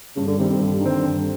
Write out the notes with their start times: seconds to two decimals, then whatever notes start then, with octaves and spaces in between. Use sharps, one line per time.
0.16 G2 C#3
0.27 D3
0.38 C3 D#3 G3 C4
0.49 C3
0.60 G2 D3
0.81 D#3 G3 C4
1.03 G2